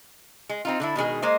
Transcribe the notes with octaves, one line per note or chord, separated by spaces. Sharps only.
G#3
C4 D#4 F4
D3 D4 E4
B2 D#3 G#3 G#4
G#3 A#3 C5 D#5